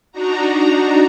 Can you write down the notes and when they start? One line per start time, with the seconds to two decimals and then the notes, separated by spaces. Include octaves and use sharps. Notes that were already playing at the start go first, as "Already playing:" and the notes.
0.12 D4 D#4 F#4 A#5